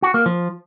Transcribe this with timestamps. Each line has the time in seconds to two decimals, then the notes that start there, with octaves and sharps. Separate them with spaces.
0.02 F#4
0.14 A#3
0.26 F3